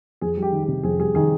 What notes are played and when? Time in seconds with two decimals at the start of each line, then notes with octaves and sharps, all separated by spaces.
0.21 F2 G#4
0.37 G3
0.42 G4
0.52 D#3
0.63 G4
0.68 C3
0.83 F2 G#4
0.99 G3 G#4
1.15 D#3 G#4